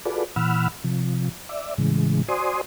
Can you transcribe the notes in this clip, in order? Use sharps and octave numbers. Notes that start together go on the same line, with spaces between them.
F4 F#4 G#4 A4 B4 D5
A#2 E3 F#5 B5 E6 F6
C3 F3
D5 E5
A2 C#3 E3 G#3
F#4 C5 D5 G#5 C6 D#6